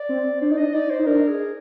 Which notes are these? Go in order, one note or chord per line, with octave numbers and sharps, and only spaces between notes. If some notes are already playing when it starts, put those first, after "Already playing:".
Already playing: D5
C4
D4 C5
D#4 D5
D4 D#5
D#4 D5
C5
D#4
D4 A#4
G#4